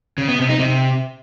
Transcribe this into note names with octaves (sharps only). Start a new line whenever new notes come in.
C#3
B3
C3
D#4
C3